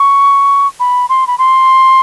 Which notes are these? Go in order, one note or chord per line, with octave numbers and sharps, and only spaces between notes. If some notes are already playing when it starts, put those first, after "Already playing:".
Already playing: C#6
B5
C6
B5
C6